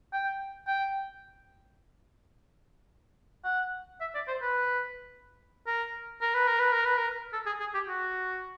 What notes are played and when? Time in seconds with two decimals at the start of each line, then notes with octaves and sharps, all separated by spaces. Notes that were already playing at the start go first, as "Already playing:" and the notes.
0.13 G5
0.68 G5
3.44 F#5
4.01 E5
4.15 D5
4.28 C5
4.42 B4
5.67 A#4
6.21 A#4
6.34 B4
6.47 A#4
6.60 B4
6.72 A#4
6.85 B4
6.97 A#4
7.33 A4
7.46 G#4
7.60 G#4
7.74 G4
7.88 F#4